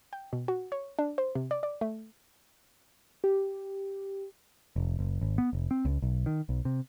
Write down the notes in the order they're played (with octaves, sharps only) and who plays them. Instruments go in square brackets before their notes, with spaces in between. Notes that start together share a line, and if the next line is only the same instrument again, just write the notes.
[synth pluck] G5
B2
F#4
C#5
D4
C5
C3
D5
D5
A3
[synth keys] G4
[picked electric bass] F1
F#1
G#1
B3
F1
C4
C#2
B1
D#3
B1
C3